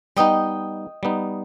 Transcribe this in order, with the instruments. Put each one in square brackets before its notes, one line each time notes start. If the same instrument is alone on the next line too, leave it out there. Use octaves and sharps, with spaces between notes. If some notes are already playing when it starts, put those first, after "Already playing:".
[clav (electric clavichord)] G3 B3 D#4 [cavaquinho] D#5 G5
[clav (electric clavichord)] G3 B3 D#4